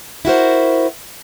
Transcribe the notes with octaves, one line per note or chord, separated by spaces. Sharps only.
E4 F#4 A#4 C5